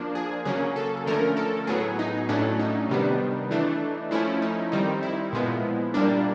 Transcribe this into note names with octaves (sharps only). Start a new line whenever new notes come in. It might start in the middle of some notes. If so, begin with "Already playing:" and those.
Already playing: F3 A#3 D4
G#4
C#3 F#3 A#3 C#4 G#4
A4
D3 F3 A3 C#4 A#4
A4
A2 F#3 B3 G#4
D#4
A2 F#3 A3 C#4 D4
D#4
C3 D#3 G3 B3 D4
E3 A3 D4
F3 A3 C#4 E4
D#4
D#3 G3 C4 D#4
E4
A#2 F3 G#3 B3
A#2 G3 A#3 D4